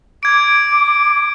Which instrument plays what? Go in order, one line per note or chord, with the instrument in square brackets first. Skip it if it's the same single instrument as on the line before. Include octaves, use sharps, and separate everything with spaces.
[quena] D6 [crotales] G#6 D7